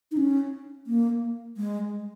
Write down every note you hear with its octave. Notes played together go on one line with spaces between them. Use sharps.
D#4
C#4
A#3
G#3